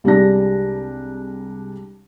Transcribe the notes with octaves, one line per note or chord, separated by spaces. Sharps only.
C2 G3 G#3 D4 A#6